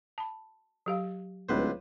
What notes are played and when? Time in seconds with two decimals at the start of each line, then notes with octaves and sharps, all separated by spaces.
0.18 A5 B5
0.86 F#3 G4 F5
1.49 D1 C#2 B4 C5